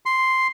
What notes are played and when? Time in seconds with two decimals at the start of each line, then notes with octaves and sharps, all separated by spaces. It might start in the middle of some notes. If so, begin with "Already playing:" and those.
0.06 C6